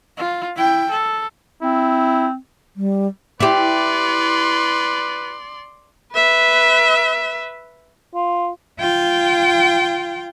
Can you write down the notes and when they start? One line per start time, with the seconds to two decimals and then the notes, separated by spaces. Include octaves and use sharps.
0.17 F4
0.56 E4 G5
0.90 A4
1.62 C4 E4
2.76 G3
3.40 E4 G4 B4 D5 C6
6.13 B4 E5
8.14 F4
8.79 F4 G5